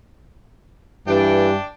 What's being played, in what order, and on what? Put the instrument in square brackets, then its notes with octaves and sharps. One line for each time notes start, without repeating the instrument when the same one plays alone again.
[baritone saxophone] G2 [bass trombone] E3 [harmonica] D4 G5